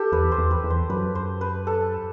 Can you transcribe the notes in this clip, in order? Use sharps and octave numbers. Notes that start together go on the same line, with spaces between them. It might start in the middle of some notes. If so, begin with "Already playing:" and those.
Already playing: G4 A4
E2 B4
C5
E2
B4
E2
C5
F#2 B4
C5
B4
A4